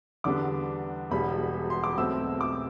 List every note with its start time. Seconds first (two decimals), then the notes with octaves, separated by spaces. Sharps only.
0.24 E2 D3 G3 B3 D4 D6
1.11 E1 E2 B2 G3 B5
1.70 C6
1.84 D6
1.97 B1 B2 A3 C4 E6
2.41 D6